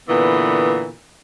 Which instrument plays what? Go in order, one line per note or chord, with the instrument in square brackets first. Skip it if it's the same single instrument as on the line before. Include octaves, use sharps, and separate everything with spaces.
[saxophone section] A#2 D3 E3 B3